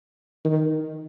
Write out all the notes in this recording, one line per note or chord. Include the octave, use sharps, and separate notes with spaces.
D#3